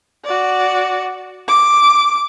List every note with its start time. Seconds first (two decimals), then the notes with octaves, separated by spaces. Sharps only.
0.25 F#4 D5
1.48 D6